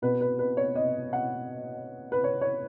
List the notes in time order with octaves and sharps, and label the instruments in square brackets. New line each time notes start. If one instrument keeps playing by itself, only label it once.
[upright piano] B2 B3 B4
B4
B4
C#5
D#5
F#5
B4
C#5
C#5